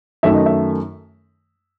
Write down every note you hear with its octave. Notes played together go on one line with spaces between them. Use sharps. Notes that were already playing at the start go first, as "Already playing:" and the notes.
F#2 D#3 A3 E5
D#5
E5